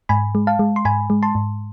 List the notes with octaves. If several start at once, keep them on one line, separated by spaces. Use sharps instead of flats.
G#2 G#5 B5
G#3
F5 A5
G#3
C6
G#2 G#5 B5
G#3
A5 C6
G#2